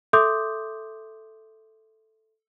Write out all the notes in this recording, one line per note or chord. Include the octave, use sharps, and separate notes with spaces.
A4 E5 C6 D6 D#6 G6